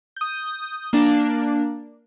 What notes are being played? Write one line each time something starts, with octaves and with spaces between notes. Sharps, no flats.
D#6 G6
A#3 D4